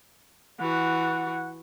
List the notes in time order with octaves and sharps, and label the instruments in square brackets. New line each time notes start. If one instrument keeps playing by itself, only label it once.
[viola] E3 F#4 [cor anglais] F#5